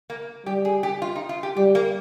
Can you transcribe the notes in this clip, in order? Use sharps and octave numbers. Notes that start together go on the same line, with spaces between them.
A#3
G3 G4
G#4
G4
F4
D#4
F4
G4
G3 G4
A#3